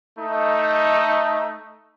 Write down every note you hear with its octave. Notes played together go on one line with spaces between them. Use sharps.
A3 D#4